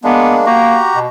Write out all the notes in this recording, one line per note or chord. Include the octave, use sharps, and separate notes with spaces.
G#3 A#3 B3 D4
A#3 F#4 G4 A#5
B2